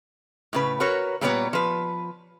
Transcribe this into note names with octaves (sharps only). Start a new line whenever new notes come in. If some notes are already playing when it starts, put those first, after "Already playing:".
A2 C#3 B4
F#4 A#4 B4 C#5
A#2 G3 B3 B4 C#5 A#5
F3 B4